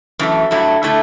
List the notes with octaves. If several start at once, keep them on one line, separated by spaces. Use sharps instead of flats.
F#2 E3 A3
G2 F#3 A3 E4
D3 A3 E4 A4